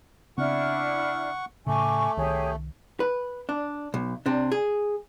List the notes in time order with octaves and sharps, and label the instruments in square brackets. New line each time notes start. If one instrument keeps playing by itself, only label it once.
[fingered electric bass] C#3 B3 C4 [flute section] D4 E4 F6 [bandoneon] F#5 C#6
[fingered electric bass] A2 C#3 [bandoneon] A3 [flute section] G#5 C#6 D6
[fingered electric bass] C2 D#3 [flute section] G4 G#4 C#5
[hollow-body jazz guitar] B4
D4
B1
C3 D4
G#4